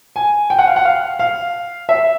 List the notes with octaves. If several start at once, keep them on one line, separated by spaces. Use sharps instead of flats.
G#5
G5
F#5
F5
F#5
F5
F5
E5